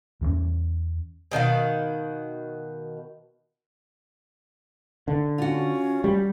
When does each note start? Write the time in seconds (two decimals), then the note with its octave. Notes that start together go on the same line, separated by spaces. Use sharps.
0.21 E2 E3 A3 C#4
1.31 B2 D#3 F#4 F5
5.08 D3
5.38 C#4 F4 F#4
6.04 G3 G4